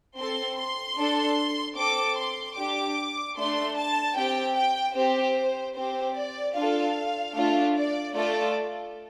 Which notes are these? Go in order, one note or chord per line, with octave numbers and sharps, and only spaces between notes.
C4 A4 C6
C6
D4 A4
C4 A4 D6
C6
D4 G4 D6
A3 D4 A4 C6
A5
C4 G4 G5
G5
C4 G4 C5
C4 G4 C5
D5
D4 F4 A4 F5
A3 D4 F4
D5
A3 F4 A4 D5